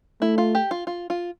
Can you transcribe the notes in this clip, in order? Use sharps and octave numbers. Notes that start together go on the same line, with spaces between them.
A3 E4
F4
G4
F4
F4
F4